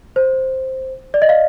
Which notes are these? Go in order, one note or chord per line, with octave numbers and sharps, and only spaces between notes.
C5
D5
D#5
F5